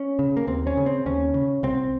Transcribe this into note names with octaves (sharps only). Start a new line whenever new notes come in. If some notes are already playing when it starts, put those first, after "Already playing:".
Already playing: C#4
C#3
A#3
D#2 C4
C#4
C#3
C4
D#2 C#4
C#3
C2 C4